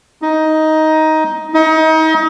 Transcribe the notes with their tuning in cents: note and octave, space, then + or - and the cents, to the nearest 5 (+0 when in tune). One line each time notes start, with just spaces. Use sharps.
D#4 +10
D#4 +35